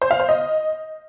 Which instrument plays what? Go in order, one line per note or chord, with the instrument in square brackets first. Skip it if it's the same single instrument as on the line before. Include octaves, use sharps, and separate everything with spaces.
[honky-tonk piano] C5
F5
C5
D#5